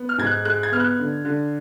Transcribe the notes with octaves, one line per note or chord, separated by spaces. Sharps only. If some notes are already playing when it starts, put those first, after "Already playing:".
Already playing: B3
F6
G#2 G#6
F#6
G#3 F#6
G#6
B3 F6
F#6
D3
D3